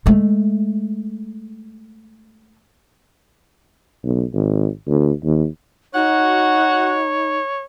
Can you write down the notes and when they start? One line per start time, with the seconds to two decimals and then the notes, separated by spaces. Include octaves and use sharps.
0.06 G#3 A3
4.04 B1
4.33 G#1
4.87 D2
5.24 D#2
5.94 D#4 F#4 C#5 F#5